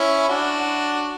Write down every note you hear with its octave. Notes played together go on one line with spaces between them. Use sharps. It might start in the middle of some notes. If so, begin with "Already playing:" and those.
Already playing: C#4 E4
D4 F#4